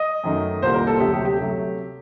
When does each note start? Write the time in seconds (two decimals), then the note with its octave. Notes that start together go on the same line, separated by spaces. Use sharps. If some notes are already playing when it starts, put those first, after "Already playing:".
Already playing: D#5
0.24 F#2 D#3 A3
0.62 C2 A#2 G3 A#3 C5
0.75 A#4
0.87 A4
1.00 D2 C3 F#3 A3 G4
1.14 G4
1.25 G4
1.39 C3 F#3 A3